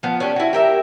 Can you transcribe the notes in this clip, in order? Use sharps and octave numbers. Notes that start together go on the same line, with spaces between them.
F3 B3
C#4 D4 G4
E4 F#4
G4 A#4 E5